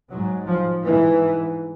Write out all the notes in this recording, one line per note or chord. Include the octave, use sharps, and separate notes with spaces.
G#2 F#3
F3
G#2 E3